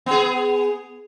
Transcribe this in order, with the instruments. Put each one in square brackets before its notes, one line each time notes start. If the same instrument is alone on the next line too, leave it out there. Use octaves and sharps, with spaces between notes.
[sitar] B3 G#4